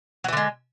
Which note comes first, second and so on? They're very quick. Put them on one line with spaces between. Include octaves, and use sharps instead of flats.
F#3 E3 D3 G#3